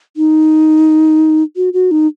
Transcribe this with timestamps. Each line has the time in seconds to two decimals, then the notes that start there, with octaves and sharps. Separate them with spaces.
0.17 D#4
1.56 F#4
1.73 F#4
1.91 D#4